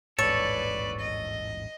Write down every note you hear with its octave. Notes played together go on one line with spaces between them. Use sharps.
D#1 A1 G#2 A4 B4 C#5 D5
D#5